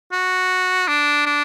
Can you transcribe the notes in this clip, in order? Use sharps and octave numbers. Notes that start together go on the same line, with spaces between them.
F#4
D4
D4